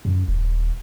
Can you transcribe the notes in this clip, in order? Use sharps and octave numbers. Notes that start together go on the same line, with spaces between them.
F#2
D#1